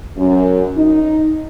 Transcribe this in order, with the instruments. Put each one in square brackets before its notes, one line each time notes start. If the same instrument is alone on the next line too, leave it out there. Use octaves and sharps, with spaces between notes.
[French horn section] F#2
D#4